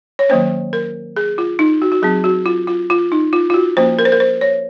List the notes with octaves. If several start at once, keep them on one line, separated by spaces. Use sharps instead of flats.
C#5
D#3 F#3 A#3 C#4 C5
A#4
G#4
F4
D#4
F#4
F#4
F#3 C4 G#4
F#4
F4
F4
F4
D#4
F4
F4
F#4
F3 A#3 C#4 C5
A#4
C5
A#4
C5
C#5